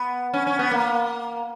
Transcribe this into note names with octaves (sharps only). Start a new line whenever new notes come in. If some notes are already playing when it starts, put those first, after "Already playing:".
Already playing: B3
C#4
C#4
B3
A#3